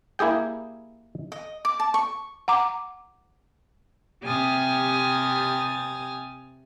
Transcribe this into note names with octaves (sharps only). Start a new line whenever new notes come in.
A#3 E4 G4 G#4 G5
D#5
D6
A5
C#6
F#5 A#5 D6
C3 G4 G#5 D#6 F6 A6